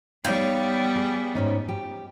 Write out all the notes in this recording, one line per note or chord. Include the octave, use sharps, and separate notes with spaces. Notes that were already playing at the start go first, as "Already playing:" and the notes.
G3 B3 D#4 C#5 F5 G5
G#4
G#2 C#4 D#4
G4